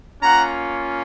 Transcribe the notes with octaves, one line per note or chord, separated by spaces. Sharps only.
A#3 C#4 F4 F#5 A#5